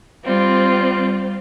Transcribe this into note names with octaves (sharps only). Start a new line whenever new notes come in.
G3 C4 F4